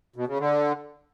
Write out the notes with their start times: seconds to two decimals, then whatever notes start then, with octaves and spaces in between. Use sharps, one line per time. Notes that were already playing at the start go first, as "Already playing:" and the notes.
0.16 B2
0.27 C#3
0.39 D3